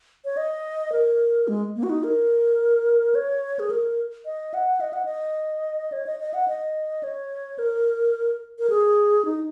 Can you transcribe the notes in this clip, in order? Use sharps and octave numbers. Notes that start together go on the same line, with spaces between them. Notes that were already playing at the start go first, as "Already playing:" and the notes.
C#5
D#5
A#4
G#3
A#3
F#4
D#4
A#4
C#5
G#4
A#4
D#5
F#5
D#5
F#5
D#5
C#5
D#5
D#5
F#5
D#5
C#5
A#4
A#4
G#4
D#4